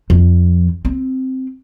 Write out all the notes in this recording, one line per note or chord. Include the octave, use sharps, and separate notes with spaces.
F2 F3
C4